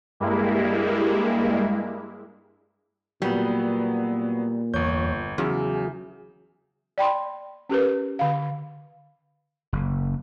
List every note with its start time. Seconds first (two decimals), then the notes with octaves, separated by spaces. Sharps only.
0.20 G2 G3 G#3 A#3 E4
3.22 A#2 F#3 G3 B3
4.74 G1 E2 C#5 G6
5.38 E2 C#3 F#3 G#4
6.98 D5 G5 B5 C6
7.69 C#4 G4 A#4 B4
8.19 D3 F5
9.73 F#1